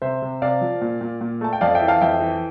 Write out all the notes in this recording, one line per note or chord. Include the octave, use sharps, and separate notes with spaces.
C3 C5 E5
C3
C3 D5 F5
F3
A#2
A#2
A#2
A3 A5
G5
F2 D5 F5
E5 G5
E3
F5 A5
F2 E5 G5
E3